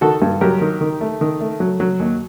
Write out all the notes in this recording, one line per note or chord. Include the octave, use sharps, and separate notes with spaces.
D#3 F#4 A4
G2
F#3 G4 A#4
D#3
D#3
A3
D#3
A3
F#3
F#3
D#2